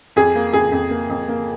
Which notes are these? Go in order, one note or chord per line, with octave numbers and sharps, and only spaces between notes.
F2 G#4
A#3
F2 G#4
F2
A#3
F2
A#3